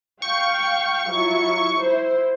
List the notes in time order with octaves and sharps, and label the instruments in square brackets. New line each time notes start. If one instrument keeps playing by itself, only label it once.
[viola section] F5 G5 [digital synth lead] C#6
[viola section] F#3 E4 F4
E4 C5